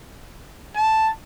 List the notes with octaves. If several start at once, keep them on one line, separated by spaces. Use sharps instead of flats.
A5